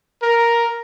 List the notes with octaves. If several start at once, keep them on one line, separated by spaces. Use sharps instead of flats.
A#4